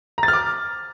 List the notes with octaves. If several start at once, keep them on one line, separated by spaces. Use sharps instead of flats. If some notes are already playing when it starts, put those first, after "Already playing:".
A#5
A6
F6
D6